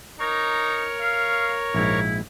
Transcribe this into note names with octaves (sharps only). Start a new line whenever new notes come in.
D#4 A#4 C#5 C#6
F5
A#1 G#2 E4